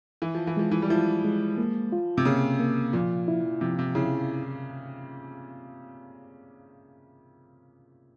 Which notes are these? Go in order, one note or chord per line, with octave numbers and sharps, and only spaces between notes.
E3 E4
F3
E3
F3 G#3
E3
G3
F3 E4
G#3
A#3
F4
C3
C#3 A#3
A#3
A#2 F3
E4
C3 F3
C3
C#3 E4